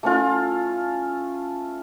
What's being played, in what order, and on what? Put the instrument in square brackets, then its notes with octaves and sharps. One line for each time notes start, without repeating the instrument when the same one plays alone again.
[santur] A3 C#4 F4